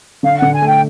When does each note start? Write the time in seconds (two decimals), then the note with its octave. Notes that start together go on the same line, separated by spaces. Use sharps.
0.23 D3 F5
0.38 D3 F#5
0.52 G#5
0.62 A3 G5